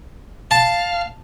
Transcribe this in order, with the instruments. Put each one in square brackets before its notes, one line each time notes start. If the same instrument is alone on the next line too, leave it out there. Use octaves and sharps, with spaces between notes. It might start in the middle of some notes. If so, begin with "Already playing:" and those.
[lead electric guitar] F5 [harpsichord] A5